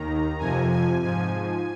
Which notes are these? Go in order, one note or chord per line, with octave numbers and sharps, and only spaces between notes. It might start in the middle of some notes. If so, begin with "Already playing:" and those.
Already playing: D#2 D#3 A#5
F2 C3 F3 G#5
G#5
G#2 F3 G#5